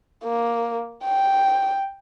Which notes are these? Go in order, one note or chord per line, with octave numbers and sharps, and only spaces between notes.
A#3
G5